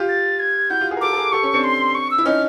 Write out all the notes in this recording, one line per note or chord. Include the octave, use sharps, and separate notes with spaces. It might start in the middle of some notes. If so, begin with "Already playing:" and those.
Already playing: F4 G4
A6
G#6
E4 F#4 G6
F4 G4
F#4 G#4
A#4
G4 A4 D6
A4
G#4 A#4
G4 A4 C#6
C#4
C4 D4
C6
C#6
E6
E4
C#4 D#4 F6